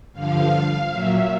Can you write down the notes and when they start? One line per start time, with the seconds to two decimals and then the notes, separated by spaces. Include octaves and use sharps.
0.13 G2 D3 F3 F5
0.91 A#2 F#3 E5